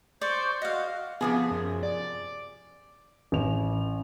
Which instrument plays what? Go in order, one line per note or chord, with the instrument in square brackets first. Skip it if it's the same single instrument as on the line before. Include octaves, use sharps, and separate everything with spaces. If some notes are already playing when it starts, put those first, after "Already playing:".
[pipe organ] C5 C#6 G6 [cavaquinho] D5
[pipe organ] F#4 [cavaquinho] D#5 F5
[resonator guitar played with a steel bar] C3 F3 G#4 [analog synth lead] B3
[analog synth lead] F#2
D5
[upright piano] A1 F7